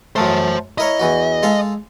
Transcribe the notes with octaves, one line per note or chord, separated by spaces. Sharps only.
F#2 A3 C5 A5
E4 A#4 C#5 D#5
E2 E3 F#4
G#3 A4 F5